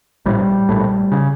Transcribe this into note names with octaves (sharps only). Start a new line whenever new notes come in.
A#1 A2 G3
A#1 A2
C#3